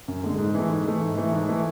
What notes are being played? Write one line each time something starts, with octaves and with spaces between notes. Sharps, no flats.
F#2
D3 G#3
G#2
E3 A3
G#2
E3 A3
G#2
E3 A3
G#2
E3 A3